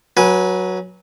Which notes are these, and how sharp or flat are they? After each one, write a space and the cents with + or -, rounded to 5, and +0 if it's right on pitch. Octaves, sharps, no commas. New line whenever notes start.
F#3 +0 B4 -25 G#5 +0